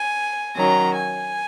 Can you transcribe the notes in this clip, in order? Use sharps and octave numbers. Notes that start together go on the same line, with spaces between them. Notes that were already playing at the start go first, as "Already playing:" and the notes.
Already playing: G#5
D#3 F#3 C#4 A#5
G#5